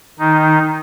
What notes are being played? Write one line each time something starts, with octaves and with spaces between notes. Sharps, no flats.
D#3 D#4